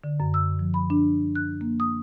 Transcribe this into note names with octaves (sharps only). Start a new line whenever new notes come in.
D3
F#2
E6
F3
B5
D4
F#6
A#3
D#6